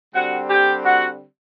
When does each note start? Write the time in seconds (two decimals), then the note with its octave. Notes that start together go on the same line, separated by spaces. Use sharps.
0.14 D3 G3 C4 F#4 F#5
0.49 G4 G5
0.83 F#4 F#5